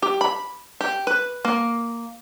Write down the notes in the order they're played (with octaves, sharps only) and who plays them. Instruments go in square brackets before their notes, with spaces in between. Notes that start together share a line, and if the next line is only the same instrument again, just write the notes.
[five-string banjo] G4
B5
G4
B4
A#3